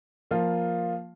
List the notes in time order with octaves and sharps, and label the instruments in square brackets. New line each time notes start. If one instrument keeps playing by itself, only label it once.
[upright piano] F3 A#3 F4